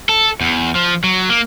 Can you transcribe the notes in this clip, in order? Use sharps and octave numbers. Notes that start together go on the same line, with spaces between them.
A4
E2
F3
F#3
A#3